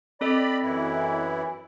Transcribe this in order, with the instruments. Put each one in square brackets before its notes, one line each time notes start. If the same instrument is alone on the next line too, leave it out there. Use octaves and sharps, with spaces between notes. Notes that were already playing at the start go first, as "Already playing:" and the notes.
[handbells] C4 A4 D#5 [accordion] D5 B5
[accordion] F#2 E3 E4